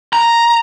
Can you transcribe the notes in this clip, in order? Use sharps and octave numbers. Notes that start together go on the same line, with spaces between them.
A#5